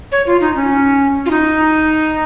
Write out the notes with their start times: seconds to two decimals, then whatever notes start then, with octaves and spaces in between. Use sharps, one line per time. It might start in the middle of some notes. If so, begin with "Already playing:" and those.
0.12 C#5
0.26 F4
0.41 D#4
0.55 C#4
1.26 F4
1.31 D#4